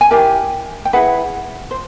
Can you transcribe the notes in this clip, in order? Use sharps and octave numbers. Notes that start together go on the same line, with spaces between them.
G#5
E4 G4 A#4 G5
G5
E4 G#4 B4 F#5
C5